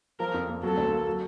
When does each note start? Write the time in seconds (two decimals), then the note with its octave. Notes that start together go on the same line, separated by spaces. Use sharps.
0.19 F3 A#4
0.34 F2
0.48 A#3
0.63 F#3 A4
0.77 D2
0.92 A#3
1.07 F#3